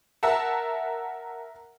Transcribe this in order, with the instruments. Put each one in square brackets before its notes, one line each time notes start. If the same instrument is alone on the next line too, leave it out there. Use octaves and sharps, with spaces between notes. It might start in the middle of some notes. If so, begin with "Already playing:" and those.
[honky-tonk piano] A#4 E5 F#5 A5